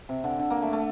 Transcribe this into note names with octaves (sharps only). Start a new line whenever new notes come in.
C3
D3
D3
A#3
A3
A3